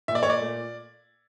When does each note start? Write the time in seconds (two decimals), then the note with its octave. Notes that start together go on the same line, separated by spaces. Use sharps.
0.08 A#2 E5
0.15 D5
0.23 A#2 C#5
0.30 D5
0.40 A3